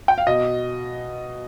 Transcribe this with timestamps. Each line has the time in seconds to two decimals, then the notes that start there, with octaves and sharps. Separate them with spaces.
0.08 G5
0.18 F5
0.27 B2 D#5